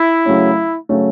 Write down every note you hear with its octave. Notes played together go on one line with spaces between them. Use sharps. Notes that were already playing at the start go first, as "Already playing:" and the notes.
Already playing: E4
C#3 F#3 A3 C#4
C#3 F#3 A3 C#4